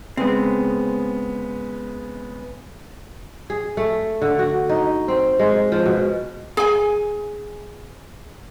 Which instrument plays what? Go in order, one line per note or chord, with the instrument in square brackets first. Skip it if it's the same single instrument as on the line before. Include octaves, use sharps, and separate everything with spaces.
[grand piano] C#3 G#3 B3 [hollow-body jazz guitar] C4
[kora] G#4
A3
D3
F#4
D#4
C4
G#3
F3
B2
[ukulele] G#4 G#5